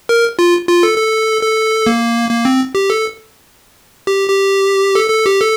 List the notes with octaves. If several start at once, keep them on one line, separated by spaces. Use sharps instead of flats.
A#4
F4
F4
A4
A4
A4
A#3
A#3
C4
G4
A4
G4
G4
A4
A4
G4
A4